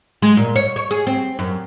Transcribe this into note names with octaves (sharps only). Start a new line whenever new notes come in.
G#3
A#2
C#5
C#5
G#4
C4
F#2